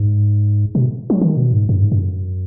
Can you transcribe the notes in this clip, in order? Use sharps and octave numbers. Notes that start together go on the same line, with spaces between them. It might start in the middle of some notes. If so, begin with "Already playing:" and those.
Already playing: G#2
B2
F#3
D#3
B2
G#2
F#2
G#2
F#2